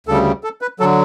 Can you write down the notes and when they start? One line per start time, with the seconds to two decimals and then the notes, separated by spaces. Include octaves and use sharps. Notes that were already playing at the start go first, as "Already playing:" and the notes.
0.07 D2 C#3 G3 A4
0.44 A4
0.61 B4
0.80 D3 F#3 A4